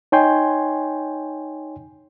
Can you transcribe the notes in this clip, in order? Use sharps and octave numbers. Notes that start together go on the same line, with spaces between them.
D#4 C#5 G5 G#5 C6 G6